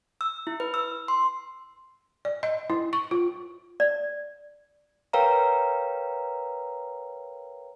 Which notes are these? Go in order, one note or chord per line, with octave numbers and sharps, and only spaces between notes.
E6
E4
B4
E6
C6
D5
D#5
E4
C#6
F4
D5
A#4 B4 C#5 F5 G5 A#5